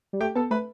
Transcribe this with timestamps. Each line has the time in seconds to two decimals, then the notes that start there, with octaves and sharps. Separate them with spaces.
0.13 G3
0.20 A3 G4 G5
0.35 B3 A4 A5
0.50 A3 B4 B5